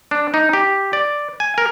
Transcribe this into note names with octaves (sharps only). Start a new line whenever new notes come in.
D4
D#4
G4
D5
G#5
A#4